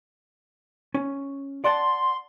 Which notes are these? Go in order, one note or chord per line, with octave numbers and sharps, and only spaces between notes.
C#4
D5 F#5 A5 C6